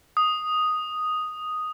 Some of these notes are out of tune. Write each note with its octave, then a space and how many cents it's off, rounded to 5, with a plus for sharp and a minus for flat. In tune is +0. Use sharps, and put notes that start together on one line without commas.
D#6 +0